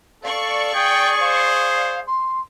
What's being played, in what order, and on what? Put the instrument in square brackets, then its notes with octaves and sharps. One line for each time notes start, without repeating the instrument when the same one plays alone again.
[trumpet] A4 [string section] D5 C#6 [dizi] F5
[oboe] G#4 [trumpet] G5
[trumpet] C5 [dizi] F5
[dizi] C6